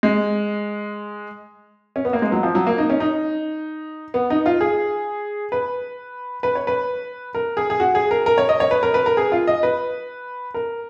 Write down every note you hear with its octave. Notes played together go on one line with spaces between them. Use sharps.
G#3
C#4
B3
A#3
G#3
F#3
F3
F#3
A#3
D#4
C#4
D#4
B3
D#4
F4
G#4
B4
B4
C#5
B4
A#4
G#4
G#4
F#4
G#4
A#4
A#4
C#5
D#5
C#5
B4
A#4
B4
A#4
G#4
F4
D#5
B4
A#4